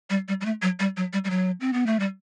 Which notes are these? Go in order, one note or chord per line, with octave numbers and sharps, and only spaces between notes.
G3
G3
G3
A3
F#3
G3
F#3
G3
G3
F#3
C4
B3
A3
G3